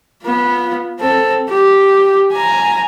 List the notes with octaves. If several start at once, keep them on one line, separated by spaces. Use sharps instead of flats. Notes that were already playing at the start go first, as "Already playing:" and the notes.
B3 F4
C4 A4
G4
G#5 A#5